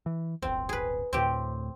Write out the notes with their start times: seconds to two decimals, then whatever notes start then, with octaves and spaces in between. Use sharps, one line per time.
0.06 E3
0.42 D1 G1 C4
0.69 G#4 B4
1.13 D2 A2 C4 G4